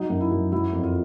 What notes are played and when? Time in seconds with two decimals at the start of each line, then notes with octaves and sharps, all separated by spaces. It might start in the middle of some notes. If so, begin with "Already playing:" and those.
Already playing: F#3 D#4
0.10 F#2
0.20 E4
0.31 F#2
0.52 F#3 E4
0.73 F2
0.83 F4